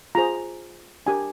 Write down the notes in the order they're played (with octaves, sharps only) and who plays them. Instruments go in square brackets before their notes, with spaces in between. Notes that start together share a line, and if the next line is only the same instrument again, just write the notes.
[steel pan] F4 G#4 C5 A#5
D4 G4 A#4 G#5